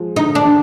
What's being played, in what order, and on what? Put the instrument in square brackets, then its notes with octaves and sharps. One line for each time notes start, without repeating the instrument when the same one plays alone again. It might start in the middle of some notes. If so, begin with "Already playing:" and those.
Already playing: [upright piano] F3 G#3
[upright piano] D3 [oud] D#4
[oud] D4
[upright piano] D3